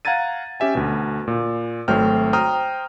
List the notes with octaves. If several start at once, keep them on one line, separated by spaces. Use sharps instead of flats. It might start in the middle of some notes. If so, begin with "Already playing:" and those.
F5 F#5 A#5 G#6 A6 D#7
C#4 G4 E5 G#5
D2 B2
A#2
G#1 F#3 A3 C5 G5 F6
C5 G5 A#5 D#6 F6